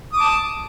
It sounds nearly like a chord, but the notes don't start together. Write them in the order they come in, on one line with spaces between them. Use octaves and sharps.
D#6 D6 A5